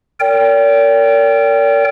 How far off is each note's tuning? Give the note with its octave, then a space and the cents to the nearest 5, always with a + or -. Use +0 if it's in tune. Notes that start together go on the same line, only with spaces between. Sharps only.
A#4 -30 D5 -45 G5 +0